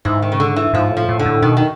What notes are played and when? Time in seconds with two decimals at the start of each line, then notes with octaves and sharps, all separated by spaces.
0.05 G#2 E3
0.22 D#3
0.32 C#3
0.40 D3
0.56 E3
0.74 G#2 F3
0.91 A2
0.97 F3
1.09 A2
1.19 D3
1.26 A2
1.42 B2 D#3
1.57 D#3